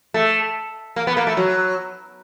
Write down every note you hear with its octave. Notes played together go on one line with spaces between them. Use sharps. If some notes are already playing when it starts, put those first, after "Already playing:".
A3
A#3
B3
A#3
A3
F#3